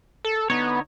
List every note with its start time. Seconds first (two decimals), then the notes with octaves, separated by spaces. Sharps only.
0.25 A4
0.50 D3 B3 D#4 C#5